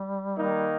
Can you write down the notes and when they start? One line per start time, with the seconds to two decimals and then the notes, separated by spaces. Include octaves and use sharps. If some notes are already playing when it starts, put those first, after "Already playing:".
Already playing: G3
0.35 D#3 A#3 D#4